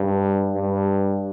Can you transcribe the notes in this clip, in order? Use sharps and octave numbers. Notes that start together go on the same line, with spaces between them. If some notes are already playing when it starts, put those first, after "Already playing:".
Already playing: G2
G2